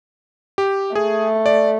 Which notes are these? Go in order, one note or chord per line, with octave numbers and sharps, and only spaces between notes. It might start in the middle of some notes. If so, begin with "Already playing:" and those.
G4
A3 G#4
D5